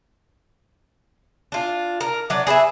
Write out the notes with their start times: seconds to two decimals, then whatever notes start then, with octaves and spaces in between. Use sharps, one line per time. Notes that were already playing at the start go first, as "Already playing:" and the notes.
1.52 D4 F4
2.01 A#4
2.30 F#3 D4 D5
2.47 G#4 B4 D5 E5